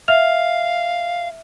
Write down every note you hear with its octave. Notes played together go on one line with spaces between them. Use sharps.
E5 F5 F6 F7